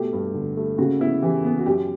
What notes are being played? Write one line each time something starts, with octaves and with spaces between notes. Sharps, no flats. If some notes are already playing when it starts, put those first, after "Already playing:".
Already playing: B2 A3 G4
G2
D3
A3
C#3 F#4
B3 E4
E3 G4
B3
F#4
F#2 G4